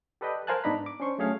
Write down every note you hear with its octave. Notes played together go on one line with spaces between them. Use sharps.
G4 A4 B4 D5 D#5 G5
A#4 C5 F5 G#5 A5 F#6
G#2 B3 D4 D#4 A#5 B5
D6
C#4 D4 C5 C6 C#6
F#3 A3 C#4 G#4 C#5 F5